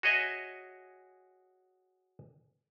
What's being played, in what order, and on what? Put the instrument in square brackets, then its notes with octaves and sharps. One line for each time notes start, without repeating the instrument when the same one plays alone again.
[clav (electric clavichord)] F#4 G#4 C#5 D#5 E5 G#5